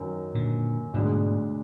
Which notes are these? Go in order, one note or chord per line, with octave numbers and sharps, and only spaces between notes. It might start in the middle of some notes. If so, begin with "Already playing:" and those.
Already playing: F#2 D#3 F#3
A#2 D3
D2 G#2 B2 D3 G#3